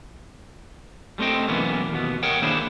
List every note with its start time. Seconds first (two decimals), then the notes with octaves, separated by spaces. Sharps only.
1.18 G3 A3 C4 D#5 G5
1.48 B1 F#2 E3 A#3 B3 C#4
1.92 D#2 B2 B3
2.23 A#4 C#5 D#5 F#5 G5
2.42 D#3 A#3 D4 E4 G#4 C5